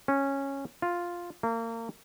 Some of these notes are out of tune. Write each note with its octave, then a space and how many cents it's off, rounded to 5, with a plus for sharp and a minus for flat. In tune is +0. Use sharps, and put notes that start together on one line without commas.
C#4 -10
F4 +0
A#3 -35